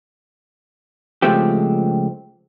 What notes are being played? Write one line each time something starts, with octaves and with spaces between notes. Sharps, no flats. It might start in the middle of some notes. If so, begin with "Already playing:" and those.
C#2 F3 G#3 A3 C4 G4